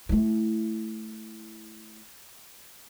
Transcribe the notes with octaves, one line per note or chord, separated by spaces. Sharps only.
A3 E4